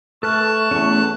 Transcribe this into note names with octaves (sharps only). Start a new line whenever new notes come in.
A3 A4 B4 A5 C#6 F6 F#6
E2 A3 C#4